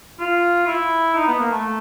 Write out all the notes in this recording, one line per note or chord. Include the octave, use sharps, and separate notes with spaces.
F4
E4
D#4
B3
A#3
A3